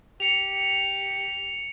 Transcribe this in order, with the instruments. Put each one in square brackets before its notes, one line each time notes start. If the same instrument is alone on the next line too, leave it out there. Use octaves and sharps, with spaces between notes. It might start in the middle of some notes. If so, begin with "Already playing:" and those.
[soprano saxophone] G4 [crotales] C#7 F7